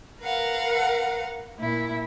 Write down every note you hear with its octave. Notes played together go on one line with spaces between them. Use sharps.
A#4 B4 F5 F#5
A#2 E4